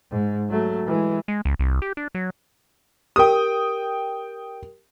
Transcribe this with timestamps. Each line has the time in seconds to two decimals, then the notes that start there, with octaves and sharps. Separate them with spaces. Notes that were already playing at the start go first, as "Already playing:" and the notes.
0.11 G#2
0.50 F#3 A3
0.86 E3 G#3
1.28 G#3
1.45 C#2
1.59 C2
1.82 G4
1.97 D4
2.15 F#3
3.16 G4 A#4 G5 D#6